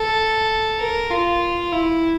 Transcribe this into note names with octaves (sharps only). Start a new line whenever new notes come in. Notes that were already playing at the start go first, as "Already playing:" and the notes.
Already playing: A4
A#4
F4
E4